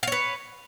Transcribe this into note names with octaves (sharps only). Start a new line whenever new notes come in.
B4 C#5 F5